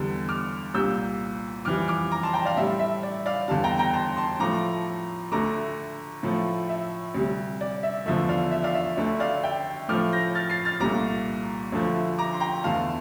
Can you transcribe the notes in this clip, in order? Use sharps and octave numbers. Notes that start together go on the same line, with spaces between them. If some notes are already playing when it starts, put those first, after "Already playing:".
Already playing: E2 D3 G3
D6 F6
C2 A#2 G3 E6 G6
F2 E3 G3 D6 F6
D6 F6
A#5 D6
A5 C6
G5 A#5
D5 F5
A2 G3 E5
E5
D5
D5 F5
E2 D3 G3 F5 A5
G5 A#5
G5 A#5
A5 C6
A5 C6
A2 F3 A3 A#5 D6
D2 D3 A3 A#5 D6
A2 F3 A3
E5
D2 C3 G3
D5
E5
E2 D3 F3 A3 E5
D5 F5
E5
D5 F5
E5
D2 D3 A3 E5
D5 F5
E5 G5
A2 F3 A3 D6 F6
G6 A#6
F6 A6
A6 C7
F6 A6
C2 A#2 A3 A#5 D6
D2 D3 F3 A3
A#5 D6
C6
G5 A#5
E2 D3 A3 F5 A5